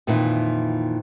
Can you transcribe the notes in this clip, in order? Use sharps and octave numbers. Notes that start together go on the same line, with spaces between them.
F2 A#2 D#3 E3 E4